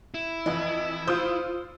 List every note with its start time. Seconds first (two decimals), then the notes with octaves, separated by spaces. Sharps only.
0.14 E4
0.46 F2 E3 D#5
1.07 F4 C5 D#6 E6